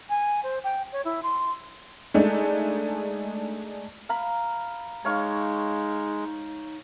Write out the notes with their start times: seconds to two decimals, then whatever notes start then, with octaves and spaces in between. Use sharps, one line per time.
0.10 G#5
0.44 C5
0.64 G5
0.93 C#5
1.05 E4
1.23 C6
2.14 G#3 A3 D4 D#4
4.09 F5 A#5 B5
5.05 G#3 D#4 C#5 F5 C#6